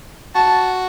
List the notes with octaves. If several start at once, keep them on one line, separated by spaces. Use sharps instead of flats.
F#4 A5